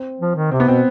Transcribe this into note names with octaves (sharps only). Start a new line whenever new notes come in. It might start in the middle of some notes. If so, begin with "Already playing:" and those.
Already playing: C4
F3
D#3
C3 C4
B3
B2 C4